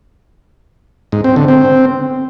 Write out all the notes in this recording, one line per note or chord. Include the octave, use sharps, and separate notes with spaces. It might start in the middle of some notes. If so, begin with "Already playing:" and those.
G#2
C4
D3
C4